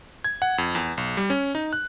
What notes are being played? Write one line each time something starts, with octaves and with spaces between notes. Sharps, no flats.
G#6
F#5
F2
E2
B1
G3
C#4
D#4
F#6